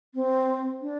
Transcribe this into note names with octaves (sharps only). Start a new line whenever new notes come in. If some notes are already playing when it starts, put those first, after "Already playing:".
C4
D4